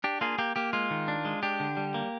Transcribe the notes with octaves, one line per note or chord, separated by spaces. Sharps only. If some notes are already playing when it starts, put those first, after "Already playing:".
D4 G4
A#3 F4 G#4
A#3 G4
A#3 G4
G#3 F4
D#3
D4
G#3
D4 G4
D3
G3
A#3